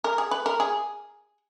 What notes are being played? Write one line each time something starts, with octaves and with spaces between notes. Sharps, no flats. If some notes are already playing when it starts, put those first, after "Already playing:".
A#4
G#4
B4
A#4
G#4